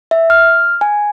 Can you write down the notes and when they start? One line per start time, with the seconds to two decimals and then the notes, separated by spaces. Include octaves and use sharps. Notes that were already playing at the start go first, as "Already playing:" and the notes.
0.11 E5
0.30 F6
0.81 G#5